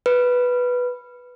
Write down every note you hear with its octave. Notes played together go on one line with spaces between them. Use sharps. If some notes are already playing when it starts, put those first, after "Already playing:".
B4